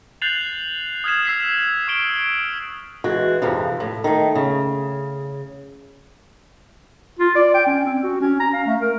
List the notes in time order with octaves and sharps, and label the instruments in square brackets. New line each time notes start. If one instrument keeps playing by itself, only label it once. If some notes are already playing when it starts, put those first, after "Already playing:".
[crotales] F#6 G6 A6 C7 F7 F#7
D#6 F6 G#6 B6 E7
E6 B6 C7
C#6 E6 D7 G7
[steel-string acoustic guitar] E3 G#3 F#4
F2 G#2 C3 E3 F3
A2
D#3 A3
C#3
[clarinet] F4
D5
G5
C#4
C4
F#4
C#4
A#5
F5
A3
A#4